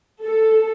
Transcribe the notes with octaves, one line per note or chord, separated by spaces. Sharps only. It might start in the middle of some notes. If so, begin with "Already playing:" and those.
A4